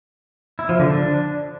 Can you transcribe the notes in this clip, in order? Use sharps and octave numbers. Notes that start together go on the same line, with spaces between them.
E4
F3
D3
D4